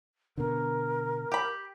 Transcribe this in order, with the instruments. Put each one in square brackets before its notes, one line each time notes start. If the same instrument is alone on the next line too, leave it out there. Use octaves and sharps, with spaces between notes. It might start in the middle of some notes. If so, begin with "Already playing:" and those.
[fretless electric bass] B2 D3 [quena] A#4
[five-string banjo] G4 B5